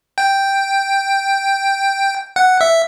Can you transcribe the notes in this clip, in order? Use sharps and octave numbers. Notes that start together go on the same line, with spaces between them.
G5
F#5
E5